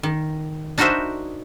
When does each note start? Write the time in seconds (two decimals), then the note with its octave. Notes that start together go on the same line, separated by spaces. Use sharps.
0.03 D#3
0.78 D4 D#4 F#4 A#4 C5 E5